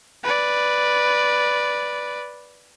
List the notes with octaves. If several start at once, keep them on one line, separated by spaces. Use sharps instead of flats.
B4 D5